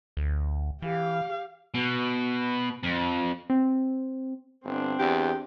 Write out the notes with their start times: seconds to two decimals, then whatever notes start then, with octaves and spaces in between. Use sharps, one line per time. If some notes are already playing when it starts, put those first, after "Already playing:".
0.17 D2
0.82 E3 G4 F5
1.75 B2
2.83 F2
3.50 C4
4.64 G1 C4 D4
4.99 E2 G4